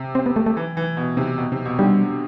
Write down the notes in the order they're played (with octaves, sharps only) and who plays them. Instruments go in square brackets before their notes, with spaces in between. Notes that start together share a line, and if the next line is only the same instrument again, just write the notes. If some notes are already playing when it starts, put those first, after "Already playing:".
Already playing: [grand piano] C3
[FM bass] C4
B3
A3
A3
[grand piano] E3
E3
B2
C3
B2
C3
B2
[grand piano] D3 [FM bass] G3